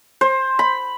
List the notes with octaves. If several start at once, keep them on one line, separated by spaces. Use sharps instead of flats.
C5
B5